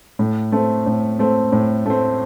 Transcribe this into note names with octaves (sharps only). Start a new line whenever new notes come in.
A2
A3 C4
A2
A3 C4
A2
A3 C4